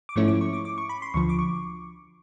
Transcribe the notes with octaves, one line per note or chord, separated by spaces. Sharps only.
D6
G#2 F3 A3 C#4 E4 C#6
D6
C#6
D6
D6
C#6
B5
C6
D2 D3 F3 C#6
D6
C#6